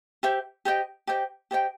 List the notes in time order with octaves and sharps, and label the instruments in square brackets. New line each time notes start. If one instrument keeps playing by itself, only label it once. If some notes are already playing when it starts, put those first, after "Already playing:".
[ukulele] G4 C5 E5
G4 C5 D#5 G5
G4 C5 D#5 G5
G4 C5 D#5 G5